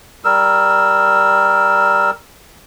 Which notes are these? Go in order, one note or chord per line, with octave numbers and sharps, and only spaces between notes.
G3 A#4 E6